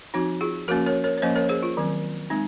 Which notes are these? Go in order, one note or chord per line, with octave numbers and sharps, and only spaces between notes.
F3 C4 D#4 F#4
F4 G#4
F3 A#3 C#4 F#4 A#4
A#4 C#5
A#4 C#5
C#5
F3 A#3 C#4 C5 D#5
A#4 C#5
G#4 C5
F4
D#3 F#3 C4
G#3 C4 D#4